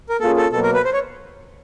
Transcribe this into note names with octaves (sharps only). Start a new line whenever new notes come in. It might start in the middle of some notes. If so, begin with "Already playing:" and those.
A#4
A#3 C#4 F4 G#4 A4
A4
B2 F#3 A#3 A4
A#4
B4
C5
C#5